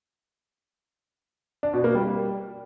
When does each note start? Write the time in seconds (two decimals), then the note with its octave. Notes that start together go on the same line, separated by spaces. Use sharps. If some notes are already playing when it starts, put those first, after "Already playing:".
1.63 D4
1.74 B2
1.84 A#3
1.95 G3